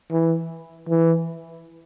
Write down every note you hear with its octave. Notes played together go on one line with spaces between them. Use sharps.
E3
E3